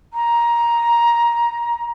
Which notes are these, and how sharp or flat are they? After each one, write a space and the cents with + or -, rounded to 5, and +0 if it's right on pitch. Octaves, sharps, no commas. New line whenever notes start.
A#5 +15